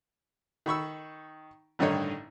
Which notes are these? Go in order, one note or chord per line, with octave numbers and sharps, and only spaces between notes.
D#3 B5 C#6 E6
A1 G2 D3 D#3 D#4 C#5